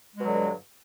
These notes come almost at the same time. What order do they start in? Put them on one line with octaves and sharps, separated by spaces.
G#3 B2 F#3 D3 G2